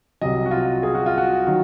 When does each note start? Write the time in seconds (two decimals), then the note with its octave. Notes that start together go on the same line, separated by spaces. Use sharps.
0.21 C2 C3 F#3 D#5
0.46 F#4
0.51 F4
0.83 G#4
0.95 F#4
1.06 F4
1.18 F#4
1.47 D#3 F#3